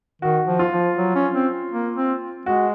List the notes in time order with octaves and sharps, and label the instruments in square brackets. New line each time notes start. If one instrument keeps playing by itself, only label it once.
[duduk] D#3 [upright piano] F#4
[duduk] F3
[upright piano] F4
[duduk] F3
F#3
C#4
C4
A#3
C4
[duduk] G#3 [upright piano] F#4